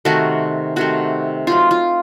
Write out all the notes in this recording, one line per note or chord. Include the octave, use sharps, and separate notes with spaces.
C3 D#3 A3 F#4 A#4
C3 D#3 A3 F#4
F#3 C4 D#4 F4
F4